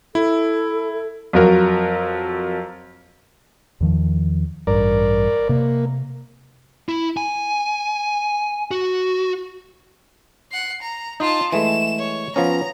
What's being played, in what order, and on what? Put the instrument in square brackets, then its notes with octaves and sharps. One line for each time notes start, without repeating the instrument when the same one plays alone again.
[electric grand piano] E4 [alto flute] A4
[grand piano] F2 F#3 A#4
[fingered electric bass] E2 D#3 F3
[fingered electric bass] A1 G2 [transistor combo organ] A#4 D5
[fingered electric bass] C3 [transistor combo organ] A#3
[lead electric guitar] E4
G#5
F#4
[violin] F#5 C7
A#5
[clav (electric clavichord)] D#4 [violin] F4 A5
[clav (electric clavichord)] E3 G#3 A3 [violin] E7
[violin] C#5
[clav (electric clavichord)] F3 B3 C#4 [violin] A#5